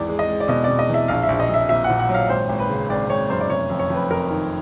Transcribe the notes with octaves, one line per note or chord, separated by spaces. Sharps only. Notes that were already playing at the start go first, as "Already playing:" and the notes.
Already playing: G#1 E2 D5
G#3
D#5
G#3
D5
B2 D#5
B2 D5
D#5
E2 E5
A#1 F5
E5
A#1
D#5
A#1 E5
A#2 E5
F#5
A#2
F#5
F#3
F5
G#1 C5
G#1
B4
C#3
G#1 D5
G#1 C#5
F#2 C5
D5
F1 C#5
F2
C#5
F2 B4
F2 A#4
D#3